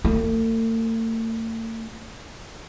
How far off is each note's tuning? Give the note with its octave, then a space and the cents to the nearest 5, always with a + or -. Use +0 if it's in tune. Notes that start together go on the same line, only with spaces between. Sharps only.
A3 +45